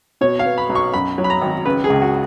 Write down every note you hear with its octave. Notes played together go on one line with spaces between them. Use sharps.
B2 C#5
F5
B3
B5
B1
C#6
F#2 B5
F#3
B5
A#5
G#1
C#3 B4
G#4
C#2
F#4